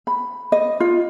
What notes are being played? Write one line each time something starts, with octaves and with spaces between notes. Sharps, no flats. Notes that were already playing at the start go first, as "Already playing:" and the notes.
B5
D#5
F4